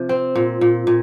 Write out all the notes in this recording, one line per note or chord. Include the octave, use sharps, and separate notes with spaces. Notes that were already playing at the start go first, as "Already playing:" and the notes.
Already playing: C3 F3
C4
A#2
A#2
A#2